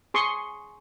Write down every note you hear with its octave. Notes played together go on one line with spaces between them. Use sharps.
G#4 C6 C#6 D#6